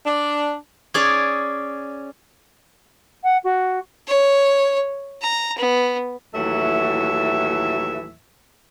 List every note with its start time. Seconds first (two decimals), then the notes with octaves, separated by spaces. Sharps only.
0.04 D4
0.94 C#4 G#4 D5
3.23 F#5
3.44 F#4
4.08 C#5
5.22 A#5
5.58 B3
6.34 D#2 A2 E3 F#3 A3 E5